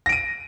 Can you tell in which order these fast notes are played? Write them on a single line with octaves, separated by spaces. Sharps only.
A#6 D7 D#7